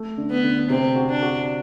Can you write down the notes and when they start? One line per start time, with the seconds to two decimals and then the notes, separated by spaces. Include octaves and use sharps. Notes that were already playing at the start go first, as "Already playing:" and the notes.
Already playing: A3
0.18 D3
0.31 B3
0.43 D3
0.70 C3 C4
0.95 F#4
1.10 D4
1.22 F#4